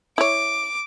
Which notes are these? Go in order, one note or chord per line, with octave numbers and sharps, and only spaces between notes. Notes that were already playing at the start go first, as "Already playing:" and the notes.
E4 C#5 D6